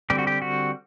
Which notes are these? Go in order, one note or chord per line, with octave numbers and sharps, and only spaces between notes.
D3 G3 C4 G4
F#4
G4
F#4